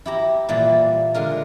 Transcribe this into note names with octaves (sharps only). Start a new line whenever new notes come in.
E4 G4 A#5
A#2 E3 G3 A#3
D3 G#3 F4 A#4